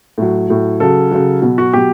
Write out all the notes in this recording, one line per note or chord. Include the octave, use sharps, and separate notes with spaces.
A2 F#3
A2 F#3
C#3 F#3 A4
C#3 F#3
B2 F#3
F#4
B2 F#3 G4